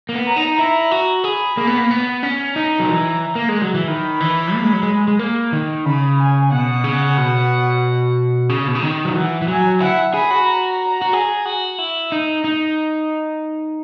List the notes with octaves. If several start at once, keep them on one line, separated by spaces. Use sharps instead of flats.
A#3
B3
A#5
D#4
E4 A#5
F#4
G#4 B5
A#3
B3
A#3
B3
C#4
D#4 A#5
F#3
E3
A#3
G#3
F#3
E3
D#3 B5
E3
A#3
G#3
F#3
G#3
G#3
A#3
D#3
C#3 B5
G#5
B2 F#5
C#3
B2
C#3
B2
C#3
D#3
F#3
E3 F#5
E3
F#3 G#5
E4 F#5
G#4 B5
F#4
A#5
F#4
G#4
F#4
E4
D#4
D#4